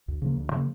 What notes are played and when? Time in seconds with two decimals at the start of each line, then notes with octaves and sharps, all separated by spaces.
0.08 D2
0.22 C#3 F3 A#3
0.37 D2
0.51 C#3 F3 A#3